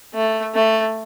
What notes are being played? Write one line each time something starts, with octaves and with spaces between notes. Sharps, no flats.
A3
A3